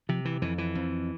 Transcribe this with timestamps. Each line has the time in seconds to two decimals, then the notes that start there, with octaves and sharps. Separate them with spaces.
0.09 C3 F3
0.25 E3
0.42 F2 E3
0.58 E3
0.75 F2